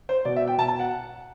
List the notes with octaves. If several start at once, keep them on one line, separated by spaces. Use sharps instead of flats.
C5
B2 D5
E5
G5
B2 A5
A5
F#5